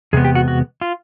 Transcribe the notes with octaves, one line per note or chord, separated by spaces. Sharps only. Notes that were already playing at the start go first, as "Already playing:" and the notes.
E2 C3 G#3 B3 G#4
G4
F#4
F#4
F4